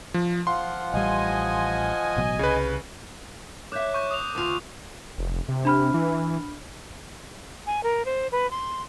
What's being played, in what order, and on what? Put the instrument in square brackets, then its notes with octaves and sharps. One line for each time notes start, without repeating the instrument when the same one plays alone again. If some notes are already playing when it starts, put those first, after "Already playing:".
[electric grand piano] F3
[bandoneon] F3 F4 F#5 [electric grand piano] C6
[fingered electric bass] A1 G3 [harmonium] D#5 G#5
[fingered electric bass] A1 B2 F#3
[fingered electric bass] C2 [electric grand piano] C#3 B4
[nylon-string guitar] C#5 E5 [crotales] D6 F#6 G6
[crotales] C#6 G6
D#6 F7
[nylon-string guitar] D2 F4
[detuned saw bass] F1
C3
[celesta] D4 B5 F6
[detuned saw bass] E3
[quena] G#5
A#4
C5
B4
C6